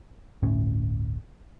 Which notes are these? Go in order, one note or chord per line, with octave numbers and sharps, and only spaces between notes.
D1 G1 A2 C#4